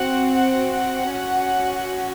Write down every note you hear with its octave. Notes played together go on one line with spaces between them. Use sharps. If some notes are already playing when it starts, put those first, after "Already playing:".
Already playing: C4 F#4 F#5
F#5
F#5
C#4 F#4